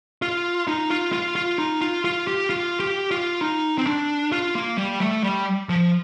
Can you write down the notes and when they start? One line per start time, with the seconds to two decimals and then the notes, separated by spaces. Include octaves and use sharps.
0.22 F4
0.68 D#4
0.90 F4
1.13 F4
1.35 F4
1.58 D#4
1.81 F4
2.05 F4
2.27 G4
2.50 F4
2.80 G4
3.11 F4
3.41 D#4
3.78 C4
3.87 D4
4.32 F4
4.55 A#3
4.78 G3
5.01 A3
5.23 G3
5.69 F3